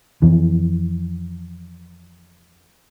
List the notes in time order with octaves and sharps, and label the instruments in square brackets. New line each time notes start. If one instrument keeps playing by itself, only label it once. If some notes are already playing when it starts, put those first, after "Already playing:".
[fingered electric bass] F2 E3